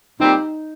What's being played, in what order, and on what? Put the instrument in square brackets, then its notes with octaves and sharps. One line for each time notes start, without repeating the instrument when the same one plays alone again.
[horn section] A#2 G3 C4 G4 [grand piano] D#4